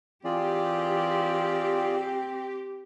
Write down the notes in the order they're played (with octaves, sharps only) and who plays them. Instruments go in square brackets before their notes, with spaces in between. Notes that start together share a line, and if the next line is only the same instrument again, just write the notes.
[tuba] E3 [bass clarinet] C4 [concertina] F4 G#4 D5 [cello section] G4